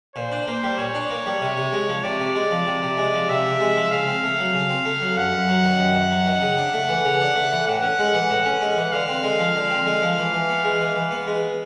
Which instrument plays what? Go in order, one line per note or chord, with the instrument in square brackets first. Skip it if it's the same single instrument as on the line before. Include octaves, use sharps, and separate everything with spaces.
[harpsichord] A#2 [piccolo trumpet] C5
[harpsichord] D4
A#3
G3
[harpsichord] A#2 [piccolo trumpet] C#5
[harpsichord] D4
A#3
G3
C3
C3
G#3
F3
[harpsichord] C3 [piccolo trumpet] D5
[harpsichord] C3
G#3
F3
C3
C3
G#3
F3
[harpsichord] C3 [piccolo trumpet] E5
[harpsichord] C3
G#3
F3
[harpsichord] C#3 [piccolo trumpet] F5
[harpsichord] C4
A3
F#3
C#3
C4
A3
F#3
[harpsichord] F#2 [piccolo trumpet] F#5
[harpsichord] F#2
F#3
D#3
F#2
F#2
F#3
D#3
C#3
D4
A3
E3
C#3
D4
A3
E3
[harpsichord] A2 [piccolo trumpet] F#5
[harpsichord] C#4
G#3
E3
A2
C#4
G#3
E3
[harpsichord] D3 [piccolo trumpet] F5
[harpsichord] C4
G#3
F3
D3
C4
G#3
F3
E3
E3
B3
G#3
E3
E3
B3
G#3